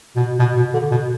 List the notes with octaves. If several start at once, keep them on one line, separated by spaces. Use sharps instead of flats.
B2
B2
B2
D3
B2